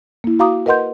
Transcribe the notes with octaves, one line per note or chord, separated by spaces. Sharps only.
A#3 E4
F#4 F5 A#5 D6 D#6
A#4 B4 D#5 F#5 C6 G6